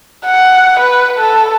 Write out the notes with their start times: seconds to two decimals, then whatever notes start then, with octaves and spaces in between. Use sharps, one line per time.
0.25 F#5
0.80 B4
1.19 A4